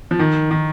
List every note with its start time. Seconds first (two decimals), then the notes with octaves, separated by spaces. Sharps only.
0.11 F3
0.19 D#3
0.51 D#3